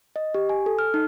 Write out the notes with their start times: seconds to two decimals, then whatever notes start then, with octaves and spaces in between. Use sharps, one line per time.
0.16 D#5
0.34 G4
0.49 G#5
0.66 A4
0.79 F6
0.94 D#4